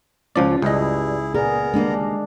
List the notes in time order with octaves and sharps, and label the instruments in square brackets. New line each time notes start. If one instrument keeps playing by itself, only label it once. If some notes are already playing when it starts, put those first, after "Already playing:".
[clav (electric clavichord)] C#2 F3 D5 [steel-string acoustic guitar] C#4 F4
[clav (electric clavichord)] C#2 D#5 [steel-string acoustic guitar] G2 G3 [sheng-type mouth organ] E4 G#4
[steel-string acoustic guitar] A#2 [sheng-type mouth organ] B3 A#4 A#5 [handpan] G#4
[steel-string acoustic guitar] D#3 G3 A#3 [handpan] G#3 D4